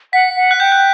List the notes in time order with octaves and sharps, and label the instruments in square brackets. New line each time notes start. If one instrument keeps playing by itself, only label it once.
[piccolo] F#5 [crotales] B6
[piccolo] F#5
[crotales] F#6
[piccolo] G5 [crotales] G6
[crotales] F#6